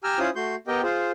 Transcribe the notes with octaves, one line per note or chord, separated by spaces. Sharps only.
G4 G5 G#5 A#5 E6 F6
C#4 E4 F4 C5 D#6
A3 F#4 C6 G6
B3 G4 A#4 D#5 G5
F4 G#4 C5